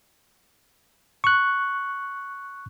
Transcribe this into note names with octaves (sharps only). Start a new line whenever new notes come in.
C#6 F#6